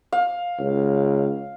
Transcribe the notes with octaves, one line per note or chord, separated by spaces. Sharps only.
F5
C#2